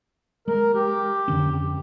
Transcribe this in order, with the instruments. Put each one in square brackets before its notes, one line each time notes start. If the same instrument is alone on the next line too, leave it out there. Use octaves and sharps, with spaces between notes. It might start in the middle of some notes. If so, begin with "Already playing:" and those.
[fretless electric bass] G#3 [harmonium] A#4
[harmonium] G4
[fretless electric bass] F2 D3 C#4